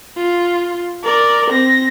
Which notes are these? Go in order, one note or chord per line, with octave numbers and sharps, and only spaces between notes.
F4
A#4 D5
C4 A#6